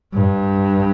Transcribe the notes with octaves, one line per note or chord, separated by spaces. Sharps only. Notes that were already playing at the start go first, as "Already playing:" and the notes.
G2